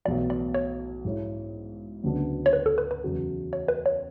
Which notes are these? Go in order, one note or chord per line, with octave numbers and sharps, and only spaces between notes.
B1 A2 E3 B3 F#4 D5
D5
C#5
G#2 G#3 C#4 E4
D2 C#3 F#3 B3 D4
C#5
B4
A4
B4
B4
E2 C#3 F#3 A3
C#5
B4
C#5